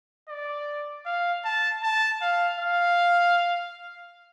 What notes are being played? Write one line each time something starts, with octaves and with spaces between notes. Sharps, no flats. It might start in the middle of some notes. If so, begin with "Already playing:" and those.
D5
F5
A5
A5
F5
F5